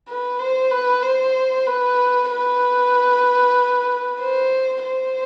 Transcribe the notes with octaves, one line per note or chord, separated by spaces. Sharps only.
B4
C5
B4
C5
B4
B4
C5
C5